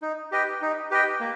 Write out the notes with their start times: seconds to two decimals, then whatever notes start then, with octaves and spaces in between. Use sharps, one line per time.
0.02 D#4
0.32 G4 B4 D#5 G5
0.62 D#4
0.91 G4 B4 D#5 G5
1.20 A#3